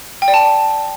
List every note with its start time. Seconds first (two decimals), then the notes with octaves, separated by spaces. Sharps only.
0.22 G5
0.28 D5
0.34 A5